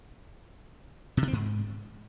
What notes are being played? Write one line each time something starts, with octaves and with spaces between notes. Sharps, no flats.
B2
C3
C4
G#2